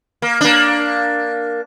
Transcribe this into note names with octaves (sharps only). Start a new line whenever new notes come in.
A#3
A#3 D4